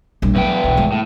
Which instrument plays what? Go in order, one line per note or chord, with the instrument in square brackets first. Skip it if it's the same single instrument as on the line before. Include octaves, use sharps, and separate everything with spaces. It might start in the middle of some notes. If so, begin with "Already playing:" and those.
[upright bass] A#1 G3
[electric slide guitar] E2 B4 G5 [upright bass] F#3 B3
[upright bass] B1 G#2
G#3
[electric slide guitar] A2